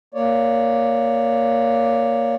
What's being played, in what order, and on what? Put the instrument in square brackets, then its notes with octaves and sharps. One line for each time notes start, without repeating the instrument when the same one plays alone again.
[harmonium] A#3 C#5 D5